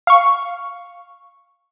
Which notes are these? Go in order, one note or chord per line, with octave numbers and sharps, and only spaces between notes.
F5 C#6